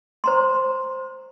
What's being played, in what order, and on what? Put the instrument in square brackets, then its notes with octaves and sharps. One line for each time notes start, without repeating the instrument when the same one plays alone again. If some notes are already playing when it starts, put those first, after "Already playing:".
[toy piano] C5 A#5 C6